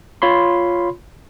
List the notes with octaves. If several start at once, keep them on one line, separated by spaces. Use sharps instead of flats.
F4 C#5 B5 C6